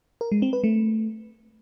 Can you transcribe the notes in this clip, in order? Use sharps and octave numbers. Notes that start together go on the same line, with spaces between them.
A#4
G#3
C4
B4
A3